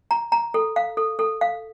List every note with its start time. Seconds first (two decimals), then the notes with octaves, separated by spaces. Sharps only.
0.11 A#5
0.32 A#5
0.54 A4
0.76 F5
0.97 A4
1.19 A4
1.41 F5